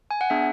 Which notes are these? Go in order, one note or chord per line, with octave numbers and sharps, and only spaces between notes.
G#5
F#5
B3 D4 G#4 E5